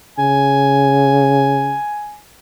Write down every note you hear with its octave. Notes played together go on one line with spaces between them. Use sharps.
C#3 G#5